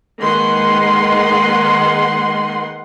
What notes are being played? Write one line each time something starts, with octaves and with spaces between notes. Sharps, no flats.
D#3 G#3 A#3 B4 F#5 C6